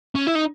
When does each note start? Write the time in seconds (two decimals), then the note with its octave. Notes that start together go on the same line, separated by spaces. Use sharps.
0.15 C#4
0.27 E4
0.35 D#4